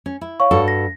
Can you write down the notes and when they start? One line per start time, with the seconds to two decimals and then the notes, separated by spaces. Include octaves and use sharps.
0.06 C#4
0.21 E4
0.40 C#5 F5 C#6
0.51 G2 F#4 A4
0.68 A#6